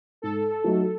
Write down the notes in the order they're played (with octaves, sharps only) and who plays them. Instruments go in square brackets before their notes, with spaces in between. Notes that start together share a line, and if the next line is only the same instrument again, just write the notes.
[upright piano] G#2 [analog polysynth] A4
[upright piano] F#3 A3 D#4 F#4